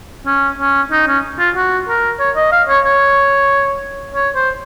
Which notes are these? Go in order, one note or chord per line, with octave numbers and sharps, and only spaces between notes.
C#4
C#4
D#4
C#4
F4
F#4
A#4
C#5
D#5
F5
C#5
C#5
C#5
C5